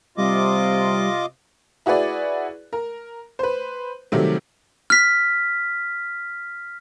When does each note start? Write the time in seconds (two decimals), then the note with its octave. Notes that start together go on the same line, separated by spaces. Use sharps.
0.18 C3 G3 F4 D#5 D6
1.86 E4 F#4 G#4 B4 D5
2.73 A#4
3.39 B4 C5
4.12 C3 D#3 F#3 G3 A3 C4
4.90 F6 B6